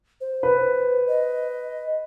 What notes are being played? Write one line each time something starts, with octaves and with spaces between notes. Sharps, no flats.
C5
B4
D#5